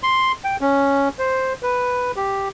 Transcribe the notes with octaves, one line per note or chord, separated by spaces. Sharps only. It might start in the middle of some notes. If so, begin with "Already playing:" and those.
C6
G5
C#4
C5
B4
G4